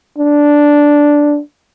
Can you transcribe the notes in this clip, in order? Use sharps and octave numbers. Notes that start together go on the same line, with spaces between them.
D4